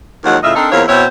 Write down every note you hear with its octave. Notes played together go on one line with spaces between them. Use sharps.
D#2 F3 F#3 G#3 F#4 F#5
A2 C#3 F4 D#5 E5
C4 D4 D#4 A4 A#4
E2 A#3 C4 F4 A#4 C#5
B2 C4 E4 F#4 C5 C#5